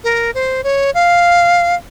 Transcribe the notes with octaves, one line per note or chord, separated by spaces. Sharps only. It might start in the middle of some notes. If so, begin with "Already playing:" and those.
A#4
C5
C#5
F5